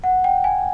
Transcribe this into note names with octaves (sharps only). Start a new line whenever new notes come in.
F#5
G5
G#5